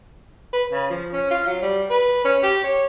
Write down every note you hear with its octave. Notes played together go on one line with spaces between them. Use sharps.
B4
C#3
F3
C#4
F4
F#3
G3
B4
C#4
G4
C#5